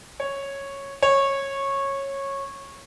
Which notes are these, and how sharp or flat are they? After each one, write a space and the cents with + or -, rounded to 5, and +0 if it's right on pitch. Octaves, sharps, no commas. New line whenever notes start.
C#5 -5
C#5 -15